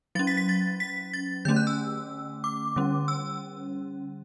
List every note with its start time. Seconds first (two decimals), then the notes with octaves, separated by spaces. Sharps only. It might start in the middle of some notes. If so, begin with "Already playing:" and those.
0.15 F#3 C#4 A6
0.27 B6
0.37 B6
0.49 A6
0.80 B6
1.13 A6
1.45 D3 A3 C#4 G6
1.56 F#6
1.67 E6
2.44 D6
2.76 D3 G3 C#4
3.08 E6